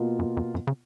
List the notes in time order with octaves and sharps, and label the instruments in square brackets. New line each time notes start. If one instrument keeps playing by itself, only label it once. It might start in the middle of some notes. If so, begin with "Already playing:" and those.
Already playing: [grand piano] B2 A#3 F4
[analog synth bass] F#2
F2
F#2
C#3